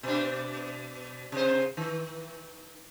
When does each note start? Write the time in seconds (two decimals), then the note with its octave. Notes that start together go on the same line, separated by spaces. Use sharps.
0.03 B2 D4
1.32 C3 C5
1.77 D#3